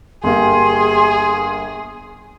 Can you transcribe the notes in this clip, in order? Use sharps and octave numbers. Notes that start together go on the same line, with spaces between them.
G1 A#3 G4 G#4 C6